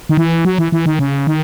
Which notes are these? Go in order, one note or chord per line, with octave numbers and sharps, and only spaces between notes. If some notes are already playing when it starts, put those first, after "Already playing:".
D#3
E3
F#3
E3
E3
D#3
C#3
D#3